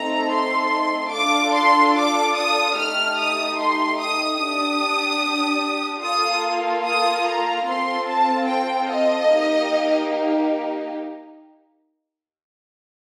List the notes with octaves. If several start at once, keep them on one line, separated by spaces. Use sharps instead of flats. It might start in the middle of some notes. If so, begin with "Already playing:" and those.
Already playing: A3 C4 D#4 A4 A#5
C6
D4 F4 A4 D6
C6
D6
D#6
A3 D#4 G4 F6
D#6
C6
D#6
D4 G4 D#6
A#3 F4 A4 D#6
D#6
A#5
C4 F4 A4 C6
A5
G5
D#5
A#3 D#4 G4